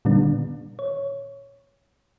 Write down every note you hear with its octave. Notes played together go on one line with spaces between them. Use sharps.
A#2 D3 D#3 G3 B3 D4
C#5